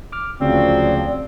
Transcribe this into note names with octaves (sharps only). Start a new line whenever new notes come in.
D6 F6
D2 C#3 F3 F#3 C4 D5